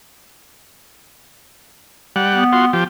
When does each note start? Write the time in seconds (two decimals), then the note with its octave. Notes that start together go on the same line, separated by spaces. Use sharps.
2.16 G3 F#5
2.35 B3
2.53 F4 F#4 C6
2.73 F3 G4